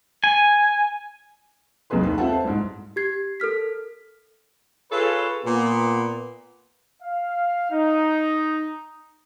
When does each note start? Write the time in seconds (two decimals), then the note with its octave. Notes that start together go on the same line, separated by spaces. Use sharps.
0.24 G#5
1.90 B1 E2 C3 G#4 B4 C6
2.03 D#2 B4
2.18 C4 F4 A4 E5 F#5 A5
2.33 C5
2.44 C2 G#2
2.96 G4 G#6 C7
3.40 A4 A#4 F6 B6
4.91 F4 G#4 A4 B4 C#5
5.44 A#2 B3
7.02 F5
7.71 D#4